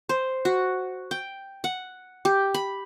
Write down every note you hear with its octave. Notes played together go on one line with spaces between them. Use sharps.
C5
F#4
G5
F#5
G4
B5